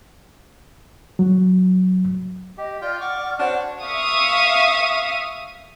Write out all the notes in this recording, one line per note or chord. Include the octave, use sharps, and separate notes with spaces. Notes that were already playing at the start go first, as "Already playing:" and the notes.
F#3
G4 D#5
F4 D5 G5 F6
F#5 C#6 D6
F#5
C4 D4 F#4 C#5 F#5
E5 F5 C#6 D#6